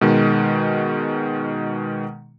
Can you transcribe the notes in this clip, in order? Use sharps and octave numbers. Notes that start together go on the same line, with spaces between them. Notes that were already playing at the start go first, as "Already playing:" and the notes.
B2 D#3 G#3